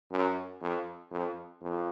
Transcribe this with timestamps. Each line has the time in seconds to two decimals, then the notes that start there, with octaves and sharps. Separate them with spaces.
0.11 F#2
0.62 F2
1.11 F2
1.61 F2